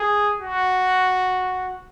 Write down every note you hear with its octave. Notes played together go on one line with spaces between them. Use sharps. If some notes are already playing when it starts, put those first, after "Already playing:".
Already playing: G#4
F#4